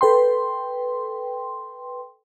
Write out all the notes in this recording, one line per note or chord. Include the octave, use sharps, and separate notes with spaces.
A4 B4 G5 C6